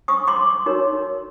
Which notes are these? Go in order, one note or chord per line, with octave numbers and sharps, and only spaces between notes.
C#6 D#6
C6 D6
D#4 F#4 A#4 C#5